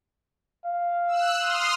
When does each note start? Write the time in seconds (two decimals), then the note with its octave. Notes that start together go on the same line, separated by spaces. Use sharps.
0.65 F5
1.08 E6 F#6
1.39 C6 D#6 F6